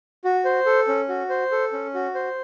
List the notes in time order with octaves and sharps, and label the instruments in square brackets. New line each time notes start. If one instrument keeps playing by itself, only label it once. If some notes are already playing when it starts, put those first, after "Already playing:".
[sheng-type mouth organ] F#4
C5
A4
C#4
F#4
C5
A4
C#4
F#4
C5